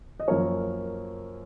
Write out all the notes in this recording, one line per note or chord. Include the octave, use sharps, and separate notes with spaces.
D#5
F#2 F3 A#3 A#4 C#5